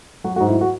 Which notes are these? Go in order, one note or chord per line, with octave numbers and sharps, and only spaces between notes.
F#3 F#4
F#4
G#2
E4
F#4